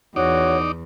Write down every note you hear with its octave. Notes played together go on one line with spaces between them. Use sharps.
E2 D#4 F#4 C#5 D5